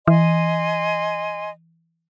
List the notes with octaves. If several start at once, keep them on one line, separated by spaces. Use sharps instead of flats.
E3 D#5 G#5 C6